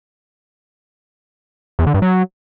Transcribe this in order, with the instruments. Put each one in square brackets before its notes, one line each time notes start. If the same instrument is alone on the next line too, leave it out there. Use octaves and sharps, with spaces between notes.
[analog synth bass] E2
D3
G2
F#3